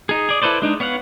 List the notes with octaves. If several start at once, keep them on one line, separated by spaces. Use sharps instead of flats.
D#4 G#4
G#4 D5
E4 A4 B4 C5 D5
G#3 D4 D#4
B3 C#5 F5 F#5